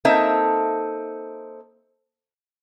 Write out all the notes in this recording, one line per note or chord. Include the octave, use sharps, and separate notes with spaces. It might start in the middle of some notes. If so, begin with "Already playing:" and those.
A#3 C4 D#4 A4 E5